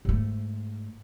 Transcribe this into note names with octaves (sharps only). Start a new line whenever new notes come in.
G#2 A3